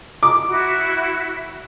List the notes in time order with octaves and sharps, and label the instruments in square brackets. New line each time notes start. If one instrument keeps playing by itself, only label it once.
[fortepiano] D6
[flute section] E4 F#4